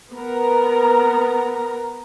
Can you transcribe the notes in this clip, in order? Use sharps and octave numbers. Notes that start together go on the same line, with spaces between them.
B3 A#4 A#5